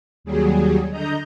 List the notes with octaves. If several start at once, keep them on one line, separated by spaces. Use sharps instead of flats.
D#2 F#3 G3 G#4
D3 D#5 A#5 G6